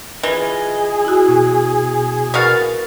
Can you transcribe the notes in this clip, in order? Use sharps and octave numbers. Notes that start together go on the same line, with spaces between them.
E3 F4 G#4 D#5
E4 F#4
B2
B3 F#4 A#4 F5 A6